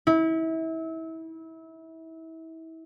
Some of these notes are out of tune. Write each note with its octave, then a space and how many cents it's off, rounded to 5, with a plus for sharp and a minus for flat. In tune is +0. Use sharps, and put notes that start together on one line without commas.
E4 -30